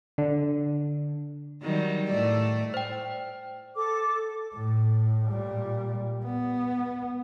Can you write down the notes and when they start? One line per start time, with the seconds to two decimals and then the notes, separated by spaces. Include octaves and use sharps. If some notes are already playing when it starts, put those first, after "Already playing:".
0.18 D3
1.63 D#3 F#3 G3
2.11 A2 A3 D5
2.74 C5 G5
3.75 A4 D6
4.54 A2
5.27 A#2 G3
6.24 B3